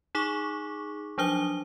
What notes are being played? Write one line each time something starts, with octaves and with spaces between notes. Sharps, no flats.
D#4 G#4 C#6 D6
F3 F#3 D4 C5 D#6 G7